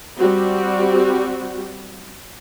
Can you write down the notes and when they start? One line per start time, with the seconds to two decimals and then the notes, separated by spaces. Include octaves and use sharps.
0.18 G3 C4 F#4